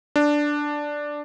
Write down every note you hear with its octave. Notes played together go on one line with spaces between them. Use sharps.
D4